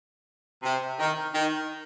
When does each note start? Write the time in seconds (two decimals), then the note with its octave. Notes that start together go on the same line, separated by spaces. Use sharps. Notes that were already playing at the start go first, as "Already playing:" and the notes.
0.63 C3
0.99 D#3
1.34 D#3